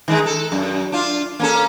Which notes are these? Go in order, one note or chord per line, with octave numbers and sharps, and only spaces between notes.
D#3 G#3 D#4
A4
F#2
D4 F4
A#3 C#4 A4